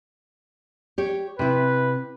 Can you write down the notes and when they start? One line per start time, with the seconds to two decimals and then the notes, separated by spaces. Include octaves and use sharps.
0.98 G4 C#5
1.39 C3 E4 B4